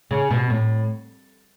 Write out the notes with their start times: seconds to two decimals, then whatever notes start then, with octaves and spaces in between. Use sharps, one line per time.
0.11 C#3
0.30 B2
0.50 A2